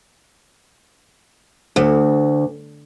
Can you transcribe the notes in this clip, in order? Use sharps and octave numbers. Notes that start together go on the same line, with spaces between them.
D2